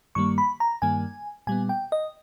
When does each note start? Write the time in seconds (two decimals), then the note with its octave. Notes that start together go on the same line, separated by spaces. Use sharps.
0.15 G2 D#3 G3 A#3 C#6
0.38 B5
0.60 A#5
0.82 G2 D#3 G3 A#3 G#5
1.47 A#2 G3 B3 G#5
1.69 G5
1.92 D#5